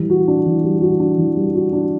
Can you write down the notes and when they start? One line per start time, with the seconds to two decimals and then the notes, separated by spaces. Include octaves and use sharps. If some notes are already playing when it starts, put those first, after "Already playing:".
Already playing: E3 G3
0.10 F#4
0.28 D4
0.46 E3
0.63 G3
0.81 F#4
1.00 D4
1.18 E3
1.36 G3
1.54 F#4
1.73 D4